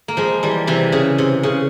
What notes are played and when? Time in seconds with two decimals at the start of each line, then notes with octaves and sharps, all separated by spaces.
0.08 A#3
0.17 F3 G#3
0.43 E3 G3
0.67 C3 E3
0.92 C#3
1.18 C3
1.43 C#3